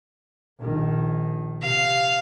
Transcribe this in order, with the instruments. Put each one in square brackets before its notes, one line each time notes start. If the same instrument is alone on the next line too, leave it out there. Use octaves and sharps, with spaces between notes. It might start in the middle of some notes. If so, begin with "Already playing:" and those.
[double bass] A#1 D#3
[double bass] C3 [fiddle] F5